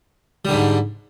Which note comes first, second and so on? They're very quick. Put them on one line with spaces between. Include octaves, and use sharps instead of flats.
G3 D3 G#2